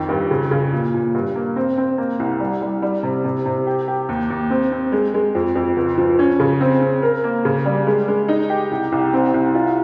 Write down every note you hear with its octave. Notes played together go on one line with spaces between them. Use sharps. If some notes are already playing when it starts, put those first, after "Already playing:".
Already playing: F2 D#3
G2
C#3
C#3
A#2
A#2
G2
A#3
C4
C4
A#3
C2
G3
G3
G3
C3
C3
C3
G4
G4
D#2
D#2
C4
C4
G#3
G#3
F2
F2
C#2
F3
C#4
C#3
C4
C4
A#4
A#3
C#3
G3
G#3
G#3
D#4
G4
C2
C2
C4
C2
F4